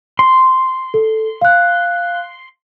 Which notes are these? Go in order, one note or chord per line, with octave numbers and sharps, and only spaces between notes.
C6
A4
F5 F#6